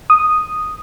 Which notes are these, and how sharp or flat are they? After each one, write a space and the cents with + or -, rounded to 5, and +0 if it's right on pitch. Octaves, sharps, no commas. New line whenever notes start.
D#6 -5